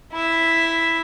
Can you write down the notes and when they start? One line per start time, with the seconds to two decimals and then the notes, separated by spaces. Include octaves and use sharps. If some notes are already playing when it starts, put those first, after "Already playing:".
0.12 E4 E5